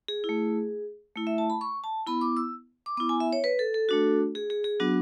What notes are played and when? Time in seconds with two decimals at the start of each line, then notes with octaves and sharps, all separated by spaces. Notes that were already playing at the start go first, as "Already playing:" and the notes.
0.08 G#4
0.24 E4
0.29 A3
1.16 A3 E4
1.27 E5
1.38 A5
1.50 B5
1.61 C#6
1.84 A5
2.07 B3 E4 B5
2.21 D6
2.37 E6
2.86 D6
2.97 B3 E4 D6
3.09 G#5
3.20 E5
3.33 C#5
3.44 B4
3.59 A4
3.74 A4
3.89 A3 D4 F#4
4.35 G#4
4.50 G#4
4.64 G#4
4.80 F#3 B3 D4 F#4